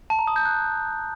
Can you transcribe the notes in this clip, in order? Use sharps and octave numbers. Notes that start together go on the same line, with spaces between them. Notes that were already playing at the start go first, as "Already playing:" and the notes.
A5
A#5
D#6
G6
F#6